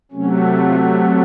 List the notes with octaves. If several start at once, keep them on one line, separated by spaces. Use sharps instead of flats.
C3 F#3 A3 C#4
F4